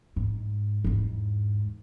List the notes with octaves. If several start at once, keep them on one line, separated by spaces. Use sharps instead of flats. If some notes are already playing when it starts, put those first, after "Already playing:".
G#2
E2 G#2